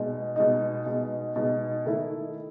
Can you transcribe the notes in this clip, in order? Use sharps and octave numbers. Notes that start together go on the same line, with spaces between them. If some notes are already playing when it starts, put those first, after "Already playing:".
Already playing: B2 G#3 D#4
B2 G#3 D#4
B2 G#3 D#4
B2 G#3 D#4
D#3 A3 E4